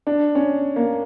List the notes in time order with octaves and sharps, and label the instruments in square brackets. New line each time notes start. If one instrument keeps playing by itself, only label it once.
[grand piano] D4
C#4
A#3